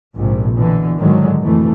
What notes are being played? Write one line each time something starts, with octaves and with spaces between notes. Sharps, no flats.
A#1 G#2 C3
B2 D3 E3
G#2 D3 D#3 F#3 G#3
F2 B2 E3 A3